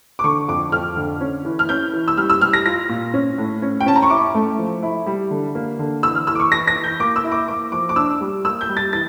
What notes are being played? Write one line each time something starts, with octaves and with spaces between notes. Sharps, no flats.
D6
D3 C#6
F2 D6
F2 F6
D3
C#4
E3
F6
C#4 G6
E3
E6
G3 F6
E6
G3 F6
A#6
F4 A#6
A#2
C#4
A2
C#4
G5
C#4 A5
A#5
C#6
E4 D6
A3
F3
E4
G3
D3
A#3
D3
E3 E6
F6
E3 E6
D6
C#6
E3 A#6
A#6
E3
G6
A#3 D6
E6
E4
D6
A#3 D6
F3 D6
D6
D4 E6
G3
A#3 E6
G6
G3
A6
E3 A6